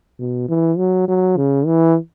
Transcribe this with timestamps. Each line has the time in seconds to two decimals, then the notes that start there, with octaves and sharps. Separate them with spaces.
0.19 B2
0.49 E3
0.77 F#3
1.07 F#3
1.36 C#3
1.66 E3